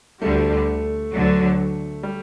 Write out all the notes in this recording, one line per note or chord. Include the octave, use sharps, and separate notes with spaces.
D2 D3 G3 A3
D2 D3 F#3
G3